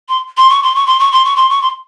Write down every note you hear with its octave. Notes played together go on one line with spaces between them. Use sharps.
C6
C6
C#6
C6
C#6
C6
C#6
C6
C#6
C6
C#6
C6